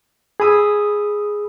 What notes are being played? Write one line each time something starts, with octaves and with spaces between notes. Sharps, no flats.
G#4 B5 D#6 E6